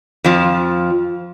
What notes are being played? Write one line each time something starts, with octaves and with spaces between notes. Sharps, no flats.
F2 F3